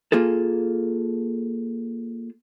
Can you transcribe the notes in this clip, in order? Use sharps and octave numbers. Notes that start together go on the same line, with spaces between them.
A#3 F4 G#4 A4